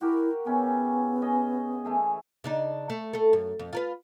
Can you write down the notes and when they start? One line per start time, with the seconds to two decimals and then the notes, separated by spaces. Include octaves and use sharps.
0.01 E4 F#4 G4 A#4
0.46 C#3 B3 C#4 E4
1.22 C#4 D#5
1.85 E3 A3 G#4
2.44 C#3 D4 D#4
2.90 A3
3.13 A3 A4
3.33 F#2
3.59 F2
3.73 F4 A#4 B4